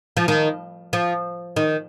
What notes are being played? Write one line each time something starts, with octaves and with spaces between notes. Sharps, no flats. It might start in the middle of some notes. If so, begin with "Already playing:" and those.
F3
D#3
F3
D#3